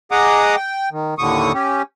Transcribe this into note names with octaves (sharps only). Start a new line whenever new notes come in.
G#4 D#5 F#5 A#5 D6 D#6
G5
D#3
D#2 A2 D3 C#6 D#6
C#4 G4